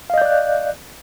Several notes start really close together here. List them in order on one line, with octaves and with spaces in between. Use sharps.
F5 D#5 G6 D5 F#6